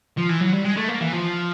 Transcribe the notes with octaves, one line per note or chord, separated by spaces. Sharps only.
F3
E3
F#3
G3
G#3
A3
A#3
E3
F3